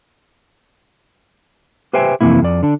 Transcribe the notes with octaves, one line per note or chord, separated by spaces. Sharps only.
G4 B4 C5 E5 G5 G#5
F2 C3 E3 A#3 E4
F2 D5
D3 D4